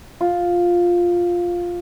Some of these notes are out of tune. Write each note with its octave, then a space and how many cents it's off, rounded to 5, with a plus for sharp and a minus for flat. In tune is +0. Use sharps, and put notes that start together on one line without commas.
F4 +5